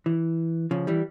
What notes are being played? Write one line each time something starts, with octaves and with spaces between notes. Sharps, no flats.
E3
C#3 F3
E3 G3